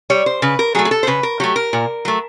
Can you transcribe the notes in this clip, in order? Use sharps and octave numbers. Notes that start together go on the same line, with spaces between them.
G3 C#5
C5
C#3 B4
A#4
F#3 A3 G#4
G#4
A4
C5
C#3 B4
A#4
F#3 A3 G4
A#4
A#2
F#3 A3